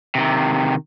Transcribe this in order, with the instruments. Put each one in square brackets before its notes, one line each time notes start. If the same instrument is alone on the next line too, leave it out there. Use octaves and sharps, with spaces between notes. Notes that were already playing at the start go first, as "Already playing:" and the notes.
[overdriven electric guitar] C3 D#3